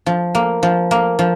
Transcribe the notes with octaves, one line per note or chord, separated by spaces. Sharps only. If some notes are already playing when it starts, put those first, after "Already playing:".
F3
A#3
F3
A#3
F3